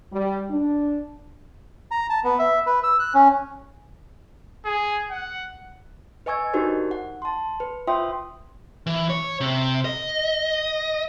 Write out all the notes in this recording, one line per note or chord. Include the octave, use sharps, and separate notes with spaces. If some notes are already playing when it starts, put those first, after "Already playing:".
G3
D4
A#5
A5
B3
E5
B4
E6
F#6
C#4
G#4
F#5
B4 D#5 G#5 C#6 E6 G#6
D4 D#4 F#4 G4 A#4 C5
F#5
A5 C6
B4
F4 C5 E5 G5 C6 D#6
E3
C#5
C3
D#5